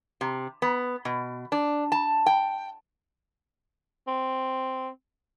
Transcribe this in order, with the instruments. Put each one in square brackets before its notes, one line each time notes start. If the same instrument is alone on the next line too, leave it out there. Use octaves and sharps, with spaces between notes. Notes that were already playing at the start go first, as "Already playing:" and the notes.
[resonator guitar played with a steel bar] C3
B3
B2
D4
A5
G5
[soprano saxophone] C4